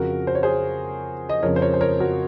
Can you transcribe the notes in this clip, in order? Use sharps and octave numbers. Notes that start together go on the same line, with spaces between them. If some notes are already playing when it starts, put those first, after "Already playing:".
Already playing: F2 C#3 F#4 A#4
C5
C#5
G#4 C5
D#5
F2 C#3 A#4 C#5
C5
A#4 C#5
C5
A#4 C#5
F#4 A#4